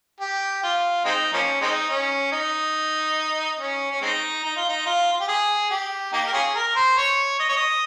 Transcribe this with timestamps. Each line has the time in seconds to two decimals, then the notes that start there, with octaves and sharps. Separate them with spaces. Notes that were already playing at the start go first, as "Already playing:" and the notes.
0.21 G4
0.63 F4
1.05 G#3 C4 D#4
1.33 F3 A#3 C#4
1.62 G#3 C4 D#4
1.90 C#4
2.32 D#4
3.59 C#4
3.91 C#4
4.02 G#3 C4 D#4
4.43 D#4
4.57 F4
4.69 D#4
4.86 F4
5.12 F4
5.20 G4
5.28 G#4
5.71 G4
6.13 A#3 D#4 G4
6.27 A#4
6.33 C#4 F4 G#4
6.55 A#4
6.76 C5
6.98 C#5
7.40 D#5
7.49 C#5
7.57 D#5